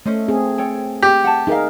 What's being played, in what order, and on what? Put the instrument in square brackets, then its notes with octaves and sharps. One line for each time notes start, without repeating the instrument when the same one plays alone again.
[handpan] A3 [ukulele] C#4 C5 D#5
[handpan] C4 G#4
[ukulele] A4 C#5 G5
[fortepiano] G4
[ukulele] F#5 A5
[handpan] D#4 G#4 A#4 [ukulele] E5 F5